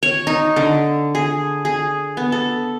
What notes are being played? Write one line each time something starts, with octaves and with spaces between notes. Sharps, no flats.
C#5
D#4
D3
G#4
G#4
B3
A4